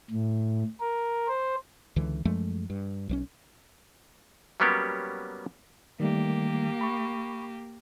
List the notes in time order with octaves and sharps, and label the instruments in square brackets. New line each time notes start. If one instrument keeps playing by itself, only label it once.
[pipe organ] A2
A#4
C5
[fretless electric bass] C#2 D3 E3
F#2 F3 G#3 A3
G2
B1 F3 C#4
[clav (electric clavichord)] F#3 G3 A#3 B3 C#4 G4
[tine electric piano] D#3 G3 A3 [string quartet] A#3 G4
[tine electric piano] B5 C#6